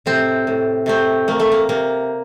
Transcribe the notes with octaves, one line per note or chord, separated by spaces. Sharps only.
A2 C3 C4
A2
C3 A3 C4
A3 A#3
A3
A#3
C3 A#3